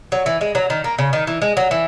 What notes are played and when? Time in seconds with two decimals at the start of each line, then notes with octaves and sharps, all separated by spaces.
0.12 F#3
0.26 E3
0.41 G#3
0.55 F#3
0.70 D#3
0.84 A#3
0.98 C#3
1.13 D#3
1.27 E3
1.42 G#3
1.57 F#3
1.71 E3